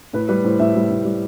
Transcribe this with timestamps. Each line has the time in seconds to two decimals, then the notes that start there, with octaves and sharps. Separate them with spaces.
0.13 A2 B4
0.29 G3 B4
0.44 A2 C5
0.59 A2 E5
0.75 G3
0.91 A2
1.05 G3